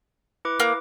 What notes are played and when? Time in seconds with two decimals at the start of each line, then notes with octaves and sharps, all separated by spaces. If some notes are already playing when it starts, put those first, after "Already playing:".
0.45 E4 B4 D6
0.60 A#3